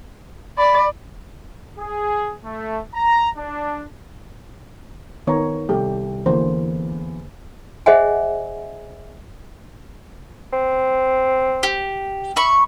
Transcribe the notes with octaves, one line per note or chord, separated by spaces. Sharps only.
D5 B5
G#4
A3
A#5
D4
D#3 B3 A#4 C#5 A#5
C2 G4 A4
E2 D3 E3 A#3 C5
G#4 C5 D#5 E5 F#5 G#5
C4
G4
E5 B5 C#6